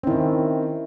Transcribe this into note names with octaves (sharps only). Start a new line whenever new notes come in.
D#3 C4 C#4 E4